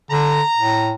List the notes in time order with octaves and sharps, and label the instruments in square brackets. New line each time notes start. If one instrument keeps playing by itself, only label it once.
[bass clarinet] D3 [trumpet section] A#5
[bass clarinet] A2